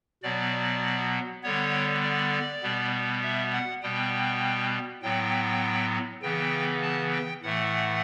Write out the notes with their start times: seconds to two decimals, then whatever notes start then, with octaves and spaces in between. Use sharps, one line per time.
0.23 B2 F#3 B3 D5
1.43 D3 G3 B3 C#5
2.03 D5
2.63 B2 G3 B3
3.23 E5
3.53 F#5
3.82 B2 G3 B3 G5
5.02 A2 F#3 B3 G5
6.22 C#3 E3 B3 G5
6.82 A5
7.12 G5
7.42 A2 E3 A3 F#5